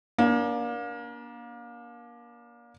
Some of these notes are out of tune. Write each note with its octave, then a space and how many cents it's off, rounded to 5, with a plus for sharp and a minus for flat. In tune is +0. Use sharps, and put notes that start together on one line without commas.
A#3 +30 D4 -30